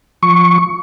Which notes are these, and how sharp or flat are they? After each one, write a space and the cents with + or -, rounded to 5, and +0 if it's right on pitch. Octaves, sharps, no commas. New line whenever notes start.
F3 +0 C#6 +0